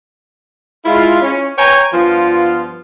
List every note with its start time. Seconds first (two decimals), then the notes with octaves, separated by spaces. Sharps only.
0.85 G#3 E4 F4
1.22 C#4
1.58 B4 C#5 G5 G#5 A#5
1.93 G2 F3 B3 F4